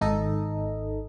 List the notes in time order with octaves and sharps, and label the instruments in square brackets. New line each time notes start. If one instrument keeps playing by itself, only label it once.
[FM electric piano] G#1 D#4 A4 D#5